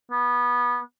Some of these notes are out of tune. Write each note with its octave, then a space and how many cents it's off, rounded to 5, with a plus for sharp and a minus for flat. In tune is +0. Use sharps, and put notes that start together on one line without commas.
B3 -20